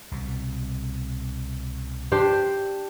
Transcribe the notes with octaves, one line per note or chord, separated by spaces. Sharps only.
C2 B2
D4 G4 C5